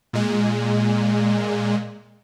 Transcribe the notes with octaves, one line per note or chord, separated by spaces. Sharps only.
A#2 G#3